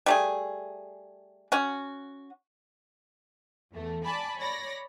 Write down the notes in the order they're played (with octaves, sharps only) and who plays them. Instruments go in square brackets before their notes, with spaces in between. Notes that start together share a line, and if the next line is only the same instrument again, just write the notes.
[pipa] G3 A3 G#4
C#4 F#4
[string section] E2 A3
D5 G#5 A5 B5
C#5 D5 B5 A#6